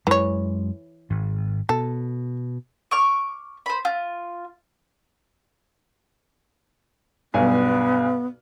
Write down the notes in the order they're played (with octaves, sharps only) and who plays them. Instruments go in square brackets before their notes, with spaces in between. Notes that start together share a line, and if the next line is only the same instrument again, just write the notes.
[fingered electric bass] F#2 G#3 [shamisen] E3 C#5
[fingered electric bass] G#1
[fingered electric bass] B2 [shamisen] A4
[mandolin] C#6 D6 F6
C5 B5
F4
[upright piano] B1 G2 G#5 [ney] B3